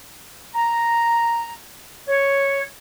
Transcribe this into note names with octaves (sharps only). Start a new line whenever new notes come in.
A#5
C#5